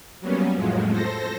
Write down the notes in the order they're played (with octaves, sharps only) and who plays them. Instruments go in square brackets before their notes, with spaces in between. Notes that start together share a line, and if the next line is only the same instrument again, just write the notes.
[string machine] F#3 G3 A#3 B3 C#4
F2 A2 F3 F#3 G#3
A4 C5 A#6